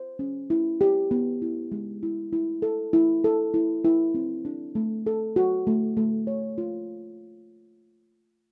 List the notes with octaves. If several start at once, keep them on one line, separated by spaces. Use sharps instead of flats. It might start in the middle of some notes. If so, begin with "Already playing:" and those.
Already playing: C5
C#4
E4
G4
B3
E4
G#3
E4
E4
A4
E4
A4
E4
E4
C4
D4
A3
A4
F#4
A3
A3
C#5
F4